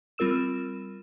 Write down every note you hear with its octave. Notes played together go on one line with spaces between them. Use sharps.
G3 C4 F4 A#4 E6 E7